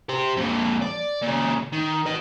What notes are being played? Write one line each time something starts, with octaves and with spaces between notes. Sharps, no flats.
G4 C5
F2 A#2
D5
A#2 C#3
D#3
B4 D#5